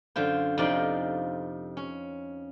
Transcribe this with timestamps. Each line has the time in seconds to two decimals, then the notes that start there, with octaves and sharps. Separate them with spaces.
0.16 F#2 D3 F4 C5
0.58 F2 C3 D#4 F4 D5 D#5
1.77 C#4